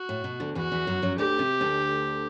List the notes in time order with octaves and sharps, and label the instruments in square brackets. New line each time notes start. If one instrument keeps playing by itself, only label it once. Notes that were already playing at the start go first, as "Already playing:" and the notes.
Already playing: [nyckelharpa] F#4
[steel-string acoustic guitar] A2
B2
D2 D3
[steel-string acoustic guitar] E2 E3 [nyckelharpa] F#4
[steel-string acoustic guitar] E2 E3
F#2 F#3
F#2 F#3
[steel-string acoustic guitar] D2 D3 [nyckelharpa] G4
[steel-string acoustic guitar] C3
D2 D3